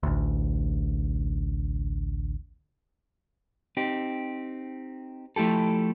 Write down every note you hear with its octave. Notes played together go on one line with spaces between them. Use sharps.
A1 D2
C4 D#4 G4
F3 A3 E4 G4 A4